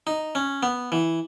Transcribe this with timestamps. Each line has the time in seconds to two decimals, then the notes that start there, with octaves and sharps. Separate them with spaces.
0.07 D#4
0.35 C#4
0.63 B3
0.92 E3